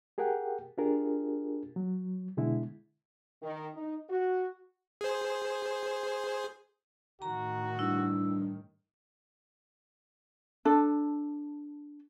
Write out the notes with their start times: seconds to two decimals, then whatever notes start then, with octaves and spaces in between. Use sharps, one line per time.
0.18 G4 G#4 A#4 F#5 G5
0.78 D4 F4 G4 G#4 A#4
1.76 F#3
2.37 B2 D3 G#3 E4
3.42 D#3
3.74 D#4
4.09 F#4
5.01 G#4 C5
7.22 A2 D#3 F#4 A#5
7.79 G2 E4
10.65 D4 A4